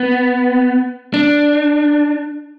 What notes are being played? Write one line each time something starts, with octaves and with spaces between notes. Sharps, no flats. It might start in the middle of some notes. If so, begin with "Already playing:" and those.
Already playing: B3
D4